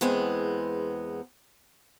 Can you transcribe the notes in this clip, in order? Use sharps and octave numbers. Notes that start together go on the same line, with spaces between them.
E2 G#3 B3 C4